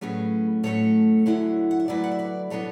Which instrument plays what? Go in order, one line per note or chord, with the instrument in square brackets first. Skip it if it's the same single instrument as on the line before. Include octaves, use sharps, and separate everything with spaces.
[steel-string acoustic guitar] A2 F#3 A3 C#4 G#4 B4
A2 F#3 A3 C#4 A4 C#5
F#2 D3 F#3 A3 E4
F#5
E5
F#2 D3 F#3 A3 E4 B4 D5
F#5
E5
B4 D5
B2 F#3 B3 D4 A4 C#5